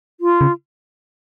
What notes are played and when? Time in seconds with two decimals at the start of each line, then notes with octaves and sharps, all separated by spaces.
0.21 F4
0.41 C#3